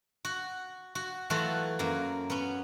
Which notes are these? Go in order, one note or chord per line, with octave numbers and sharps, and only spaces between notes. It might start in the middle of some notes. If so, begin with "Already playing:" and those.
F#4
F#4
E3 F#3 A3 F4 F#4
F#2 A#3
B3 C#4